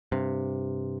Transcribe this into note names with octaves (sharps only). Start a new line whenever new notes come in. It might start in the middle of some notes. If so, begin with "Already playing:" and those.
G2 C3